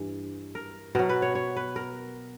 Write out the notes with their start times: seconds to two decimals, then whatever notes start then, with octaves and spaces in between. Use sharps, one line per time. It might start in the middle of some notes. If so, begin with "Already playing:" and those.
Already playing: G2 E3
0.55 A#4
0.95 B2 F#3 A#4
1.09 B4
1.22 C#5
1.35 C#5
1.56 B4
1.76 A#4